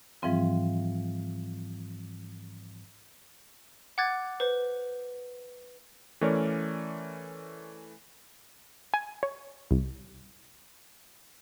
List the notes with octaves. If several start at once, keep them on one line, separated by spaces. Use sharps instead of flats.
G#2 E3 F3 G3 C4 F4
F#5 D6 F#6 G#6 A6
B4 C5
E3 A3 C#4 A#4 C#5 D5
G#5
C#5
C2